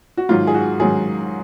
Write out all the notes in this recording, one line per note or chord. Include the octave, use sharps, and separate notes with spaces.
F#4
G#2 D#3 F#3 F4
G#4
F#4
G#2 D#3 F#3 G#4